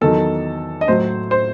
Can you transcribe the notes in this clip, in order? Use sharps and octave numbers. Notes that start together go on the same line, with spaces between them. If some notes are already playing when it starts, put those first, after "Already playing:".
E2 D#3 F#3 A4
D#5
A2 F#3 C5
C5